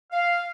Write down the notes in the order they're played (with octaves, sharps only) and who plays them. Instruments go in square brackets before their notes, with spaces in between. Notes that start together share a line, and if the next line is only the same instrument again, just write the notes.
[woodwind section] F5